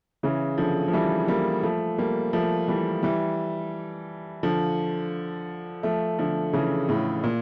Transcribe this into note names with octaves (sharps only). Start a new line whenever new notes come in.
C#3 E3
D3 F3
F3
E3 G3
G3 A#3
F3 A3
G3 A#3
F3 A3
E3 G3
E3 G3
D3 F3
F3 A3
D3 F3
C#3 E3
A2 C#3
A#2